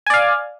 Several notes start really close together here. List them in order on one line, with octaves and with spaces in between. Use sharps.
G#5 D5 F5